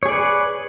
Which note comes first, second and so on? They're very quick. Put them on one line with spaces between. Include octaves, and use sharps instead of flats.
C#5 G#4 D5 B4